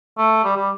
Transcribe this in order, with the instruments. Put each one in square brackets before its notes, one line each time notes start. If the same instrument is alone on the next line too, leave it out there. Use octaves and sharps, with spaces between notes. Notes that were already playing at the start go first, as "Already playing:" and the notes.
[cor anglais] A3
G3
G3